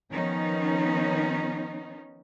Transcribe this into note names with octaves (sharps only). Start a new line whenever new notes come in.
D#3 F3 B3 C#4 D#4